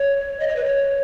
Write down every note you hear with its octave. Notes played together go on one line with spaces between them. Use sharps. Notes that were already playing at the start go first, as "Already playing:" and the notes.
Already playing: C#5
D#5
C#5
B4
C#5